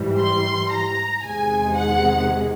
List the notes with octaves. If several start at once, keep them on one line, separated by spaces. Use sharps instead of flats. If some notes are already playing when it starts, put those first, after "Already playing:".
Already playing: G#2 E3 G3
C6
A#5
E2 C3 D#3 G#3 G#5
F#5